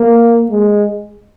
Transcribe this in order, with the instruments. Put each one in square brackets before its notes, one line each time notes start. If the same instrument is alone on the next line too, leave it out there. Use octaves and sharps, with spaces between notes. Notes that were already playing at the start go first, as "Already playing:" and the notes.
Already playing: [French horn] A#3
G#3